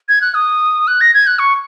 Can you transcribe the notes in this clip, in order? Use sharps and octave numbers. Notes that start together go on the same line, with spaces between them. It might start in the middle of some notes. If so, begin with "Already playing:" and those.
G#6
F#6
D#6
F#6
A#6
G#6
F#6
C#6